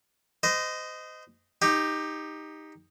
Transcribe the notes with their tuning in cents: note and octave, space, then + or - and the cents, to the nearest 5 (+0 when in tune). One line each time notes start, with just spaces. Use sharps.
C5 -35 D#5 +0
D#4 +0 G4 +15